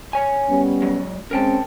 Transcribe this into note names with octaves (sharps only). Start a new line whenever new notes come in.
C#5 G#5
G3 B3 C#4
F#3 G#3
G#3 C4 C#4 A#4 G5 A5